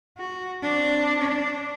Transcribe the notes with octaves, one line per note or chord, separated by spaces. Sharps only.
F#4
C4 D4
D4